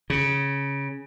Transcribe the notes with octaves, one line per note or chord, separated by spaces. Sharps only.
C#3